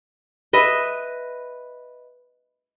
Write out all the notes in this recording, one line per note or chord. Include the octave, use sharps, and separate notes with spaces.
B4 D#5 E5